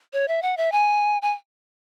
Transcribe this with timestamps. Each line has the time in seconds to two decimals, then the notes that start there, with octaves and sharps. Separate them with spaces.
0.13 C#5
0.28 E5
0.42 F#5
0.57 E5
0.72 G#5
1.22 G#5